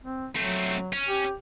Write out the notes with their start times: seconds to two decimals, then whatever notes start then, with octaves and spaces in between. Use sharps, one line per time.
0.04 C4
0.35 F#3 A3 C4
0.93 C#4
1.08 G4